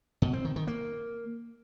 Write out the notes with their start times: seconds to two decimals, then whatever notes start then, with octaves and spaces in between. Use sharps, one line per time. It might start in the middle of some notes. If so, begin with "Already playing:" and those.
0.22 B2
0.33 C4
0.45 D#3
0.56 D#3
0.67 A#3